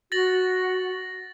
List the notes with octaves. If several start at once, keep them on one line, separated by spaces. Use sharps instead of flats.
F#4 A6 A#6 F#7